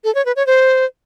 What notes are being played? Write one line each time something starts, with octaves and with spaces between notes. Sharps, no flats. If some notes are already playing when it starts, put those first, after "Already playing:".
A4
C#5
B4
C#5
C5